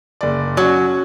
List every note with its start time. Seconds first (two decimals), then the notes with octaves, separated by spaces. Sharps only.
0.21 F#1 D5
0.57 F#3 C#4 F#4